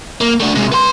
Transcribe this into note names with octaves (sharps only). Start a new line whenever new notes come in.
A#3
A3 D4
C3 G#3
B4 C6